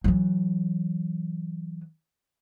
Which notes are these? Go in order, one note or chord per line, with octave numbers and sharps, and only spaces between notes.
E3 F#3